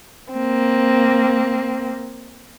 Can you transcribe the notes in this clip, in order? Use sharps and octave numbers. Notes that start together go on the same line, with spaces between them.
A#3 C4